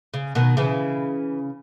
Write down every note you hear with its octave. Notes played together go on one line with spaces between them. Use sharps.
C#3
B2 D#3
C#3 E3